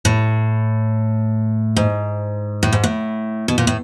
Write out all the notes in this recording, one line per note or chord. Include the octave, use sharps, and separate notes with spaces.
A2
G#2
A2
G#2
A2
B2
A#2
A2